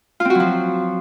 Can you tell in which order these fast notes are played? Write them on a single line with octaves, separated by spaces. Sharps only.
F4 C4 F#4 F#3 F3